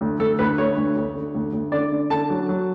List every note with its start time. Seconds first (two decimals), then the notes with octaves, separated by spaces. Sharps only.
0.01 D2
0.19 D2 A4
0.39 D2 B4
0.58 D2 C#5
0.77 D2
0.96 D2
1.15 D3
1.34 D2
1.53 D2
1.72 D3 D5
1.92 D3
2.10 D3 A5
2.30 F#3
2.49 F#3